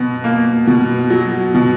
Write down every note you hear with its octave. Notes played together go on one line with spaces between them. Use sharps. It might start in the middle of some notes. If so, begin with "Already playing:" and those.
Already playing: B2 F#3
A#3
B2
F#3
B2